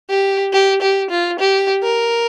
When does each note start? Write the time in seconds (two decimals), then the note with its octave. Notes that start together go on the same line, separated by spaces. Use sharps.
0.10 G4
0.53 G4
0.82 G4
1.10 F4
1.39 G4
1.83 A#4